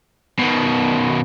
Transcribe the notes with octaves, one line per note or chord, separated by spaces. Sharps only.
B2 D#3